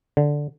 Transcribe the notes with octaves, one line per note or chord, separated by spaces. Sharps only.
D3